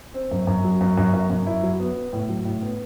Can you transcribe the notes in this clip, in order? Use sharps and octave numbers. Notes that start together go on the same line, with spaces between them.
C4
F#2
F#2
F#3
F#2
F#2
F#2
F#2
E4
F#3
B3
B3
A2
F#3
A2
B3